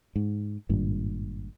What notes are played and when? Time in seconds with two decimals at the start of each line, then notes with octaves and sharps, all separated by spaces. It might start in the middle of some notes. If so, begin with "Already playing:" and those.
0.16 G#2
0.69 G#1 G2 A#2